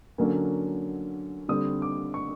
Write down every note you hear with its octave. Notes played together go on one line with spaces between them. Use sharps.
D3 F#3 A#3 C#4
D3 G3 C4 D#6
D6
C#6